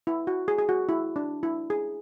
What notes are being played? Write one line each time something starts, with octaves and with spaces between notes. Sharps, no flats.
E4
F#4
G#4
G#4
F#4
E4
D4
E4
G#4